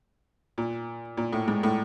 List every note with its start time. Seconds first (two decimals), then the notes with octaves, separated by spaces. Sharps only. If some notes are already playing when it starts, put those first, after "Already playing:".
0.58 A#2
1.17 A#2
1.33 A2
1.48 G#2
1.63 A2